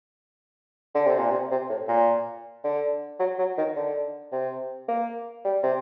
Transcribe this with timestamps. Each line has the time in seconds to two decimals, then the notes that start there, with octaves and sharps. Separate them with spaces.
0.95 D3
1.06 C3
1.19 A#2
1.31 C3
1.51 C3
1.70 A2
1.88 A#2
2.64 D3
3.19 F#3
3.39 F#3
3.57 D#3
3.76 D3
4.32 C3
4.88 A#3
5.45 G3
5.63 C3